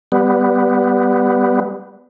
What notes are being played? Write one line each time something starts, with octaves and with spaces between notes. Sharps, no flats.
G3 B3